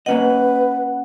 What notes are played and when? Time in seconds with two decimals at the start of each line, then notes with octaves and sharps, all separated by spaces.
0.06 A#3 C#4 B4 D#5 F#5